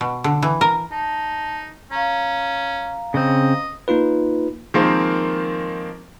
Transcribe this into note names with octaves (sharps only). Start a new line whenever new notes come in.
B2
D3
E3
A#4
D#4 A5
C#4 F5 A#5
C#3 C4 D#5
A#3 D#4 F4 B4
D#3 F3 G#3 A#3 C4